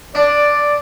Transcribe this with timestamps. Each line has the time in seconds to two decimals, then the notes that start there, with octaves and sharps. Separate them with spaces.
0.15 D4 D5